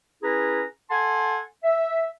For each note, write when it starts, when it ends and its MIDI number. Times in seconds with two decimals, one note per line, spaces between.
0.23 0.63 61
0.23 0.63 64
0.23 0.63 68
0.23 0.63 71
0.23 0.63 82
0.90 1.40 69
0.90 1.40 78
0.90 1.40 80
0.90 1.40 81
0.90 1.40 84
1.63 2.05 76